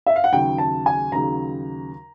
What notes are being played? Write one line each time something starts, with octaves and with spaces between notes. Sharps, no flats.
E5
F5
F#5
D#2 C#3 F#3 G5
A5
G#5
D#2 C#3 F#3 A#5